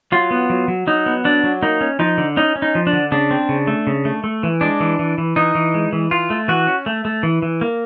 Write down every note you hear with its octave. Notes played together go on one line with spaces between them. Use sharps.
F#3 F4
B3
F#3
F#3
F#3 D#4
B3
F#3 D4
F#3
A#3 D#4
C#4
F3 D#4
D3
C#4 D#4
C#4
D#4
F3
D4
D3
C#3 D4
C4
C#3
A3
C#3
A3
A3
E3
G#3 D4
E3
E3
E3
E3 D#4
E3
G#3
E3
E3 F4
A3
E3 F#4
C#4
A3
A3
E3
E3
A#3